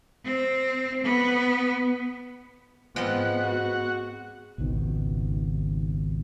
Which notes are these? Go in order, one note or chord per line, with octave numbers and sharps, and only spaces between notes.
C4
B3
G#2 F3 G#3 B3 C4 F#5
F#4
G#1 C#2 B2 D#3